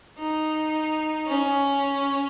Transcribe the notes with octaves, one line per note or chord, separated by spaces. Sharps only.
D#4
C#4